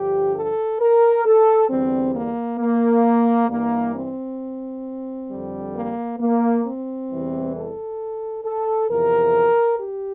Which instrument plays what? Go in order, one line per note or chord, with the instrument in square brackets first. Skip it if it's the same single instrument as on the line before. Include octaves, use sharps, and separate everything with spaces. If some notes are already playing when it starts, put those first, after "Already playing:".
Already playing: [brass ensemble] G2 D3 F3 G4
A4
A#4
A4
E2 D3 G3 C4
A#3
A#3
G2 E3 G3 A#3
C4
F2 D3 G3
A#3
A#3
C4
E2 C3 E3 G3
A4
A4
E2 C3 F3 A#4
G4